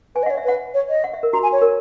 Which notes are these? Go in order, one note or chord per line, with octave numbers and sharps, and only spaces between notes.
B4 G#5
D#5
C#5 F#5
E5
B4 F#5
C#5
D#5
F#5
E5
A#4
F#4 A#5
G#5
C#5
A#4